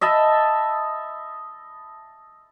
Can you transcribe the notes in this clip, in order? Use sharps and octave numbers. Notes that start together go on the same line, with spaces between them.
D#5 E5 A5 B5